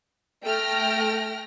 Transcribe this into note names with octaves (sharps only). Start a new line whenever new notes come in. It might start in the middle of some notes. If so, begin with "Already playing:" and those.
A3 G5 F6 A#6